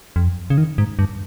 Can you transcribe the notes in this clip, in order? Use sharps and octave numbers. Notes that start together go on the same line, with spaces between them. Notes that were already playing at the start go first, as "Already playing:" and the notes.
F2
C#3
D#3
G#2
G2